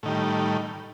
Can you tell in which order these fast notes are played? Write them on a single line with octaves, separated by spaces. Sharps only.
A2 D#3 G3